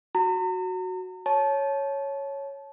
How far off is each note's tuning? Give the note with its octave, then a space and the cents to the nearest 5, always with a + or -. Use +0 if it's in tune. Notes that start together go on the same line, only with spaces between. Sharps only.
F#4 +0 A#5 -40
C#5 +0 A5 -20